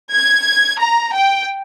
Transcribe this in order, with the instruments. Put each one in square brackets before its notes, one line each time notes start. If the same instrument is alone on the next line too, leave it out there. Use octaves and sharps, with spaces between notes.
[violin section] G#6
A#5
G5